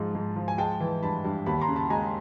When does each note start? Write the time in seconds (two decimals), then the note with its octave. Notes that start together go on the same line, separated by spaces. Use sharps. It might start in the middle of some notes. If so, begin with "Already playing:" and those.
Already playing: G#2 F3
0.15 G#2
0.36 F3
0.48 G#5
0.58 G#3 G5 A5
0.80 E3
1.02 G2 A5 B5
1.24 G2
1.46 D#2 A5 B5
1.61 A#5 C6
1.68 C#3
1.76 A5 B5
1.90 G#3 G#5 A#5